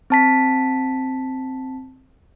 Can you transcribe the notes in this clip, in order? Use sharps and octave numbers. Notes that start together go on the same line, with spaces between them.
C4 A5 B6